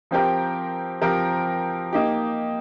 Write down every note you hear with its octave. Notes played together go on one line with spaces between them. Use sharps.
F3 C4 G4 A#4
F3 C4 G4 A#4
A#3 D#4 G4